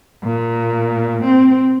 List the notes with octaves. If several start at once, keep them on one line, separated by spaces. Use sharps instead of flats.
A#2
C4